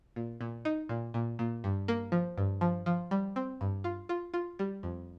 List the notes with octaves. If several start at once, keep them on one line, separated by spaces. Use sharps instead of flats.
A#2
A#2
D#4
A#2
A#2
A#2
G2
A#3
F3
G2
F3
F3
G3
C4
G2
F4
F4
F4
G3
F2